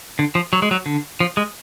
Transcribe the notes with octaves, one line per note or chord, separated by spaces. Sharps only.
D3
F3
F#3
G#3
F#3
D3
F3
G#3